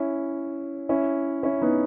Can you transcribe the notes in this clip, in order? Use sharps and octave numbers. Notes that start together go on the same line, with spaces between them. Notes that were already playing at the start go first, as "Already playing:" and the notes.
Already playing: C#4 E4
C#4 E4
C#4 E4
B3 D#4